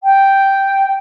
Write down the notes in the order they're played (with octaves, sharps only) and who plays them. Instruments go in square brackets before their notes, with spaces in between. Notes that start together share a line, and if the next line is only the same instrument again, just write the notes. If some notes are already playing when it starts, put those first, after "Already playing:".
[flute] G5